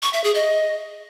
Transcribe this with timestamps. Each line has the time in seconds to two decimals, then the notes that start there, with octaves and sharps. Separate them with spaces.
0.02 C#6
0.13 E5
0.24 G#4
0.35 D#5